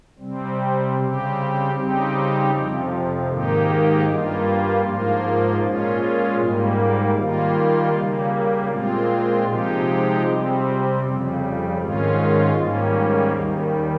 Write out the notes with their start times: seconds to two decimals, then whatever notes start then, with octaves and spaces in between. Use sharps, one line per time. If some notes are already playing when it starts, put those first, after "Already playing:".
0.19 C3 G3 C4
0.97 C#3 G3 C4 G4
1.74 C#3 G3 C4 D#4 G4
2.51 F2 C3 F3
3.29 G#2 D#3 A#3 D#4 G4
4.06 G2 G3 A#3 F4
4.82 G#2 F3 A#3 F4
5.60 A#2 G#3 C#4 F4
6.37 G#2 G3 A#3
7.15 D#3 G3 A#3 F4
7.92 C#3 G3 A#3
8.69 A#2 G#3 C4 F4
9.46 C3 F3 G#3 D#4 G4
10.23 C3 G3 C4
11.00 F2 C#3 G3
11.78 G#2 D#3 G#3 C#4 F4
12.55 G#2 D#3 G3 A#3 C#4
13.31 D#2 D#3 G3